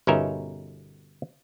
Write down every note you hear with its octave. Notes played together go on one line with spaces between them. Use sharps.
G1 B2 C#4 D#4 A#4 E5